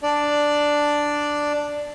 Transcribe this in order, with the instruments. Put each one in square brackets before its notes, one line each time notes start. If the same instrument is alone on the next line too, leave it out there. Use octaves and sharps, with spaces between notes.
[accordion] D4 D5